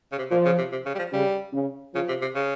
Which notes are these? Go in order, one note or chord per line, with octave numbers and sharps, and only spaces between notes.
C#3
C3
A#2 F3
C#3
C3
C3
C#3
G3
F3
C#3 G3
C#3
C#3 F3
C3
C3
C#3